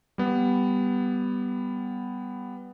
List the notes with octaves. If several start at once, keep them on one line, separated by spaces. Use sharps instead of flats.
G3 B3